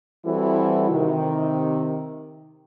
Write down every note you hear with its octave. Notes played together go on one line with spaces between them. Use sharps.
E3 G3 C4 E4 F#4 A4
C3 D#3